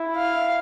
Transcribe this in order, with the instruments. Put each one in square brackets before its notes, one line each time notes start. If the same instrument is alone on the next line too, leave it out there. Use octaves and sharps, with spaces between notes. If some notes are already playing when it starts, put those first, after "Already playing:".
Already playing: [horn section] E4
[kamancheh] F5